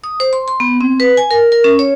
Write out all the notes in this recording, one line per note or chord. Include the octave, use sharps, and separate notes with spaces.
D#6
C5
C6
C6
B3
C4
B4
G#5
A#4
A#4
C#4
C#5